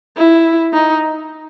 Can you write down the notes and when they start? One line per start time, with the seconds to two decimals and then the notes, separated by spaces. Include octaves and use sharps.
0.17 E4
0.73 D#4